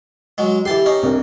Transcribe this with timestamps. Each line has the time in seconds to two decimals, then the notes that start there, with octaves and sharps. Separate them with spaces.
0.38 F#3 G#3
0.65 E3 G4 A5 C6
0.86 C#4 D#4
1.03 C2 D4 A#4